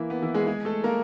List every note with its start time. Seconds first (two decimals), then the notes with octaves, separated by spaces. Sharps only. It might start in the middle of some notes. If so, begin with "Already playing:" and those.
Already playing: E3 A#3 E4
0.10 B3
0.22 E3 E4
0.34 G#3 G#4
0.46 G#3 G#4
0.65 A3 A4
0.84 A#3 A#4